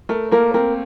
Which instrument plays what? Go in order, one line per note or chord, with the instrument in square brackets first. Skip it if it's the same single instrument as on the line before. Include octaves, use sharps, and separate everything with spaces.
[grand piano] A3 [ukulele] A#4
[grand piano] A#3 [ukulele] A#4
[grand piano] C4 [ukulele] A#4